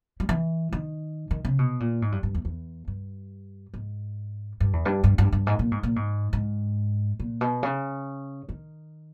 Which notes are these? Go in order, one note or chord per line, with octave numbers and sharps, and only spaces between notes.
G3
E3
D#3
D#3
C#3
B2
A#2
G#2
G2
G2
E2
E2
G2
G#2
G2
E2
G2
G2
G2
G2
G#2
A#2
G#2
A#2
G#2
G#2
A#2
B2
C#3
D#3